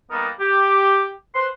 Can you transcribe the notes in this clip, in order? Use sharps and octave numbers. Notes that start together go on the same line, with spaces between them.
G3 A#3 B3 D#4 A4 A#4
G4
B4 C5 F#5 C6